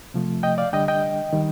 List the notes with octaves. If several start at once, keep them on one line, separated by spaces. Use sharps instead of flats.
C3 F3 A3
D#5 G5
D5 F5
D3 G3 D4 D#5 G5
D#5 G5
D#3 G3